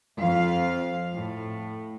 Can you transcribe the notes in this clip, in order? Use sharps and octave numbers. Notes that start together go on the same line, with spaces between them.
F2 F5
A2